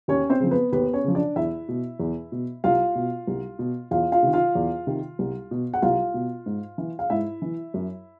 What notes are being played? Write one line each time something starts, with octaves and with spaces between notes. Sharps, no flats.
D#2 C#4 C#5
C4 C5
C#3 F3
B3 B4
D#2 B3 B4
C#4 C#5
C#3 F3
D4 D5
E2 E4 E5
B2
E2
B2
C2 F4 F5
B2
C2
B2
E2 F4 F5
F4 F5
C3 D#3
F4 F5
E2
C3 D#3
C2
B2
F#5
C2 F4 F5
B2
G#2
E3
F5
G#2 E4 E5
E3
F#2